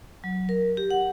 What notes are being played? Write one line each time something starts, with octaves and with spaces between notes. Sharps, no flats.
F#3
A#4
G4
F#5